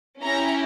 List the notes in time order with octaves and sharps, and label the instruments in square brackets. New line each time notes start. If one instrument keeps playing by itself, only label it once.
[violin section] C#4 E4 G4 A#5